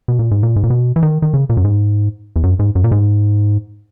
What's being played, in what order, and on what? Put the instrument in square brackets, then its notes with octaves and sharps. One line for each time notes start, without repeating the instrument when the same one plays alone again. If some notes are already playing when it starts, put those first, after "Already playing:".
[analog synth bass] B2
A#2
G#2
A#2
G#2
A#2
B2
E3
D#3
D#3
C#3
A#2
F#2
G#2
E2
F#2
G#2
F#2
A#2
G#2